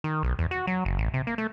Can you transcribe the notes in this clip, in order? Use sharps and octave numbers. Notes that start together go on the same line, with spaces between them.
D#3
B1
E2
F#4
F#3
F#1
A1
C3
A#3
A3